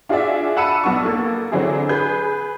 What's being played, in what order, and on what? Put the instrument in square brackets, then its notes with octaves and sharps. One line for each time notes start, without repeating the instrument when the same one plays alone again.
[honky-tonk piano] D4 F4 F#4 G#4 D5 E5
F#5 A5 B5 E6 C#7 D#7
B1 B3 D4 C#6
A#3 A4
D3 F#3 C4 D4 E4 G#4
G#4 B4 G6